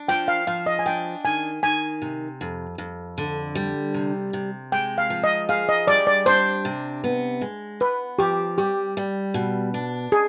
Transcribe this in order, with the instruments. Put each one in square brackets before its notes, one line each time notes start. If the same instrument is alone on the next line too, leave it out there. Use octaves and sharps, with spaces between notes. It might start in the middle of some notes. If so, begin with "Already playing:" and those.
Already playing: [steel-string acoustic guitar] D4
[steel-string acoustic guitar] F3 [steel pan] G5
[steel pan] F5
[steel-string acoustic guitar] F3 [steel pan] F5
[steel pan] D#5
G#5
[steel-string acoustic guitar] D4 [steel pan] G5
[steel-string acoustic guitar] D#3 [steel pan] G#5
[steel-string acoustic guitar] D#3 [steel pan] G#5
[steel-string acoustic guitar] C3
F2
F2
D3
G3
C3
C3
[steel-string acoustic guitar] G#3 [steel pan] G5
[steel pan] F5
[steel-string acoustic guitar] F3
[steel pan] D#5
[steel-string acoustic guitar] G#4 [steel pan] F5
[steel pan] D#5
[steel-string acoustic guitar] G3 [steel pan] D5
[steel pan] D5
[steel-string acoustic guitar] D4 [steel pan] C5
[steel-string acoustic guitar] C3
B3
G#3
[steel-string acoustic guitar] B3 [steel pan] B4
[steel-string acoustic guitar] F3 [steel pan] G4
[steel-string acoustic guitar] G3 [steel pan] G4
[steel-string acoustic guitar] G3
B2
D4
[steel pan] G#4